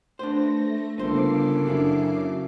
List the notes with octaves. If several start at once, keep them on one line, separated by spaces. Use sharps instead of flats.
A3 D4 B4 C5 A#6
G1 C#3 A#3 A4 B4 C5 D6 C7
F#2 F#3 D4 E4